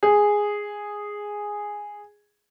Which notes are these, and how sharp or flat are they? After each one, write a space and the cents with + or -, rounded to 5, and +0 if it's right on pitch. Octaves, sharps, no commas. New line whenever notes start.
G#4 -5